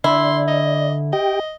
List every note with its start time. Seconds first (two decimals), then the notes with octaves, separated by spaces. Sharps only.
0.04 D3 E4 D5 C6
0.48 D#5
1.13 G4 D#5 G5